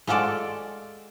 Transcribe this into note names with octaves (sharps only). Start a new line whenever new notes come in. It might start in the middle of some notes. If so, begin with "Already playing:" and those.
G#3 F4 F#4 A4 D5